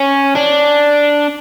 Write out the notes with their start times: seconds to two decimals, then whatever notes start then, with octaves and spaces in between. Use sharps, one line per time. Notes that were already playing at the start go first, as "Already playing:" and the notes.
Already playing: C#4
0.36 D4